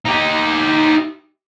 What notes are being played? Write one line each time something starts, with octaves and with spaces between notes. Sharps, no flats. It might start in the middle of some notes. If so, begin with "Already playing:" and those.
D#4 G4